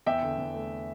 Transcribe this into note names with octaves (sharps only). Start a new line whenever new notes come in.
E2 E5 G5
D3
E2
A3